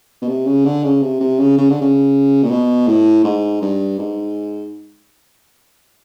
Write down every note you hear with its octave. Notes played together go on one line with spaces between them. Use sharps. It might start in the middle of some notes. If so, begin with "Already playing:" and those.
B2
C3
C#3
D3
C#3
C3
C3
C#3
C#3
D3
C#3
A#2
B2
A2
G#2
G2
G#2